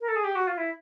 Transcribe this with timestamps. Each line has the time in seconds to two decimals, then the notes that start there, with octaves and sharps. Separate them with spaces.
0.01 A#4
0.08 A4
0.16 G#4
0.24 G4
0.35 F#4
0.47 F4
0.58 E4